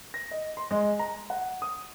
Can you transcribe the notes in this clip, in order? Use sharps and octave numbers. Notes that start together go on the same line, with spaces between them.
A#6
D#5
C6
G#3
A#5
F#5
D#6